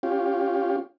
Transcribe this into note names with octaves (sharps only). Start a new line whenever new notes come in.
C#4 F4 G4